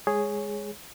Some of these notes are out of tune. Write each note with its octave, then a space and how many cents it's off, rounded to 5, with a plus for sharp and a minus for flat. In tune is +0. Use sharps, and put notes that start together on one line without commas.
G#3 -15 G#4 +0 C#5 +0